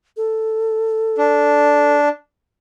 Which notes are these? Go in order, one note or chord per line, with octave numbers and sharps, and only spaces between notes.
A4
D4